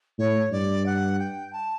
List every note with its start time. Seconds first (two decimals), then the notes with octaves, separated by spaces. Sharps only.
0.18 A2 C#5
0.51 G2 D5
0.86 F#5
1.19 G5
1.53 A5